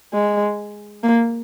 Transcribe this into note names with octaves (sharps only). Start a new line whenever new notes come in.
G#3
A#3